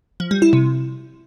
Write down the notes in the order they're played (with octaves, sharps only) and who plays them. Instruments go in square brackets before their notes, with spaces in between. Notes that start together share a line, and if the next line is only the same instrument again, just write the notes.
[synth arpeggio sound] F3
G3
E4
C3